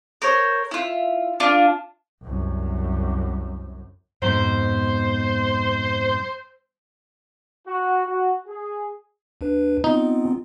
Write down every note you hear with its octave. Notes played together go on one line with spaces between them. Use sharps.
A#4 C5 C#5
E4 F4
D4 F4
C2 F#2
F2 G#2 B2 C5
F#4
F#4
G#4
D#2 D4 B4
B3 C4 D#4 F4